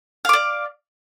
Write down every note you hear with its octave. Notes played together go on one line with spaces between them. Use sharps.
D5 F5 D6